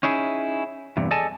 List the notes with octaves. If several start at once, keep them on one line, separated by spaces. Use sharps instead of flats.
C#4 D#4 E4 G#4
E2 G2 C3
G#4 A4 D5 D#5 G#5 A5